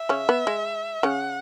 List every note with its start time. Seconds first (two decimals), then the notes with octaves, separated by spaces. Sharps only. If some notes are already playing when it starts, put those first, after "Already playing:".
Already playing: E5
0.09 C#3 C#4
0.29 B3
0.47 G#3
1.03 C#3 C#4 F#5